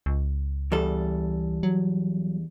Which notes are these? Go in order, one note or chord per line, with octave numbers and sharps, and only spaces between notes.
C#2
E2 G3 A4
F#3